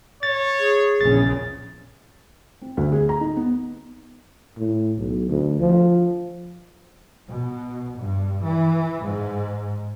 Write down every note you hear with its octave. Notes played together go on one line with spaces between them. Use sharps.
C#5 A6
G#4
A#1 E2 C#3 A6
C4
D2
G#4
A#5
D#4
B3
A2
B1
D2
F3
B2
G2
E3
G#2